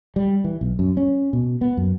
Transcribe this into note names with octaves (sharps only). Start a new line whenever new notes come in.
G3
E3
B1
F#2
C#4
B2
B3
F#2